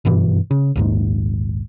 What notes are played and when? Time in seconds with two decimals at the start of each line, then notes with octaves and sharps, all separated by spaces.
0.05 F#1 G2 B2 E3
0.51 C#3
0.76 A#1 D#2 G#2